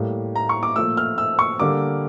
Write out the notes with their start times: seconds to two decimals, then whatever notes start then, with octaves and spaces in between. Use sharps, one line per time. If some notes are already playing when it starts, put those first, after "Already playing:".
Already playing: A2 G3 A#3
0.36 A#5
0.49 C#6
0.63 D6
0.76 A#2 F3 A3 E6
0.97 F6
1.18 E6
1.39 C#6
1.59 D3 G3 A#3 D6